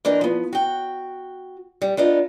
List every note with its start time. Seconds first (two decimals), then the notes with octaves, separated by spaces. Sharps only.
0.05 E3 D4 D#4 A#4
0.21 F3 B3
0.53 F#4 G5
1.82 G3
1.97 B3 D4 D#4 F4